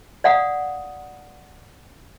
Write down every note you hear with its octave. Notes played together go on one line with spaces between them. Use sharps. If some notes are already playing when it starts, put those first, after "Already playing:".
D5 F5 F#5 D#6